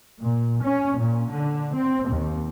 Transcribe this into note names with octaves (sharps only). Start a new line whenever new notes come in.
A#2
C#4
A#2
D3
C4
D#2